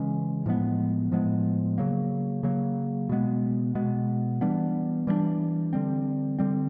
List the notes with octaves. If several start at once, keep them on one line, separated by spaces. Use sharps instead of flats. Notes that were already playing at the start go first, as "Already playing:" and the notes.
Already playing: C#3 E3 G#3 C#4
A2 F3 G#3 B3
A2 F3 G#3 B3
C#3 F#3 A#3
C#3 F#3 A#3
B2 G#3 B3
B2 G#3 B3
E3 G3 B3 D4
E3 G3 B3 D4
D3 G3 C4
D3 G3 C4